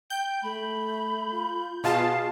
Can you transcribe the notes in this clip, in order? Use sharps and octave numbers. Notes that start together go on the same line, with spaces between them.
G5 G6
A3 B5
F4
B2 F4 G#4 F5 A5